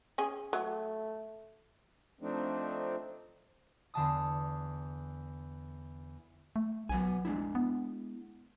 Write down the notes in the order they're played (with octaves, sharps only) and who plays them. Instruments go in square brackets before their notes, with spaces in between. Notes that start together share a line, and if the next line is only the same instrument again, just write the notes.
[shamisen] C#4 G#4
[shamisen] F#3 [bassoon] A3
[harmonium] F3 A3 C4 D4 D#4
[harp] E2 D3 A5 D#6
[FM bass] A3
[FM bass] B1 [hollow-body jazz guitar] F#3 B3 G#5
[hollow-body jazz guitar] G#3 D4 E4
[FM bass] B3